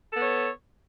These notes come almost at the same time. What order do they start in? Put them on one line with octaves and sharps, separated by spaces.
A4 B3 C#5